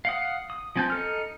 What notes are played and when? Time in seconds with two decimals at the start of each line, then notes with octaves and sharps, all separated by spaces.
0.05 F5 F#5 D#6
0.50 D#6
0.76 F3 C4 G#5 A5 G6
0.90 D#4 A4 F6